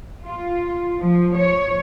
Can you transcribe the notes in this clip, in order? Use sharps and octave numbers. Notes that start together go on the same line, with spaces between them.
F4
F3
C#5